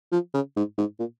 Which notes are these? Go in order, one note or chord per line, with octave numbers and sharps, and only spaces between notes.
F3
C#3
G#2
G#2
A#2